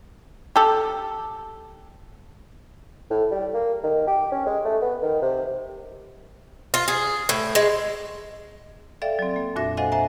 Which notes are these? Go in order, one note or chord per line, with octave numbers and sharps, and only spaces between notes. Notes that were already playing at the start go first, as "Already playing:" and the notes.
G4 A4
A2
G3
A#3
D#3
G4
C#4
G#3
A3
B3
D#3
C3
F4
G#4
A2
G#3
A4 D5 E5 F5 G5
F#3 C4
A#3
F2 A#2 D4 F#4 E5 A#6
A4 C5 D#5 F5 F#5 G#5
C5 E5 G#5 A#5